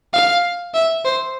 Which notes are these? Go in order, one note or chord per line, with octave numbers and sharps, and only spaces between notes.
F5
E5
C5